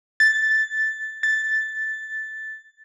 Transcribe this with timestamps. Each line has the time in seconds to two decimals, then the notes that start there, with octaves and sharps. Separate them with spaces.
0.20 A6
1.23 A6